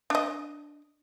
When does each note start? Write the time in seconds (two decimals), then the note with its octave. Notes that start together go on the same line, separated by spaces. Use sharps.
0.10 D4 D#5